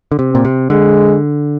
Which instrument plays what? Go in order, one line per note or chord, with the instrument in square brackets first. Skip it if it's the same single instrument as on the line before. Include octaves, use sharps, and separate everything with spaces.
[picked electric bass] D3
C3
[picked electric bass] A#2 [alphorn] C4
[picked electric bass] C3
[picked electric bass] D3 [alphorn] G#3